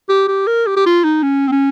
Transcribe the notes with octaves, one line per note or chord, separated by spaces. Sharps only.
G4
G4
A#4
G4
G4
F4
D#4
C#4
C4
C#4